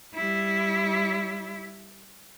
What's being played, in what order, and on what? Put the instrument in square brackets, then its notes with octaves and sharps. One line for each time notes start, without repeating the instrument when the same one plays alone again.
[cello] G3 E4